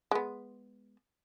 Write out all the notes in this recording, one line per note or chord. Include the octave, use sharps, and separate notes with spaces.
G#3 B3